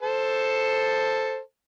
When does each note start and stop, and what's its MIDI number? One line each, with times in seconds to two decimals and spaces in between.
0.03 1.39 69
0.03 1.39 72
0.03 1.39 81